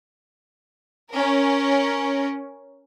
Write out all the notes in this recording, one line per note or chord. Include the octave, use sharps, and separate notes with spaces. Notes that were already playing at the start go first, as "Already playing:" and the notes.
C#4 A#4